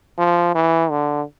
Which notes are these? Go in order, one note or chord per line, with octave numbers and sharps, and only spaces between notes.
F3
E3
D3